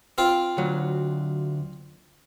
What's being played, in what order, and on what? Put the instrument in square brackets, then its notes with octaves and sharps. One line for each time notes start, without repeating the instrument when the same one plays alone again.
[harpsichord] C4 F4 G5
[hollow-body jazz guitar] D2 F#3